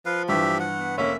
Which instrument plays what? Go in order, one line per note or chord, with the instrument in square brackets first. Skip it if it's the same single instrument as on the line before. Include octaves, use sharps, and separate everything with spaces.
[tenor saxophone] F3 [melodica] B4 F5
[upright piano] G2 E3 [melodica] G4 E5
[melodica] F#5
[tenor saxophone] B3
[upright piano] F1 A#3 [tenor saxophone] C#4 [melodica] E5